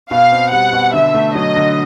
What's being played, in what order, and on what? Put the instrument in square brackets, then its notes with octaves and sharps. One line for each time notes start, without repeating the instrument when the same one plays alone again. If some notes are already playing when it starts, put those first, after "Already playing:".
[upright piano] B2 [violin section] F5
[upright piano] C4
[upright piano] G3 [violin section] F#5
[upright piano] B2
[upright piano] D3 [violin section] E5
[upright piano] A3
[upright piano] F#3 [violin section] D#5
[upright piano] D3